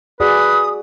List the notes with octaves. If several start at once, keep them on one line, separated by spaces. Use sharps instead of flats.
F#4 G#4 B4 D5 D#6